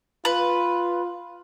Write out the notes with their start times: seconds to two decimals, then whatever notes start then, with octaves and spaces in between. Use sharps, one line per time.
0.25 F4 B4